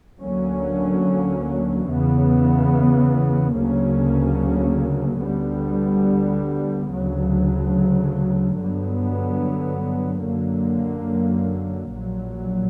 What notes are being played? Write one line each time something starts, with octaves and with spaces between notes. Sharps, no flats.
D2 D3 F#3 A#3 C#4
E2 C#3 E3 B3
D2 C#3 F#3 A#3 C#4
D2 D3 G3 B3
D2 C#3 F#3
G2 D3 F#3 B3
F#2 D3 F#3 A#3
A#1 A#2 F#3